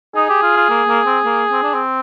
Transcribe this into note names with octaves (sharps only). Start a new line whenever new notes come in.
D#4 G#4
G4
F4
F4
A#3
A#3
C4
A#3
C4
D4
C4